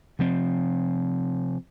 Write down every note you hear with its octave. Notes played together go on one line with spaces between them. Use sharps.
C3 F3 C4